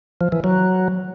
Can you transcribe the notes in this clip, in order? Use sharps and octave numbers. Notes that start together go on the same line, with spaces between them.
F3
E3
F#3